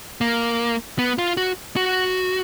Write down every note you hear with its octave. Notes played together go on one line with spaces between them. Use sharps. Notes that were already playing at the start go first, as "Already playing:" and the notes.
A#3
B3
F4
F#4
F#4